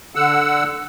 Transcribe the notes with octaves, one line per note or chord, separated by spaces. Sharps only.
D3 F#5 E6